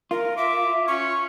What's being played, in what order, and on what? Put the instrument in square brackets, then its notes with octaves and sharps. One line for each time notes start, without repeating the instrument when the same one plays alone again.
[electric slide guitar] F4 [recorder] A#4
[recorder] E5 [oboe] D6
[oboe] C#4 [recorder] C#6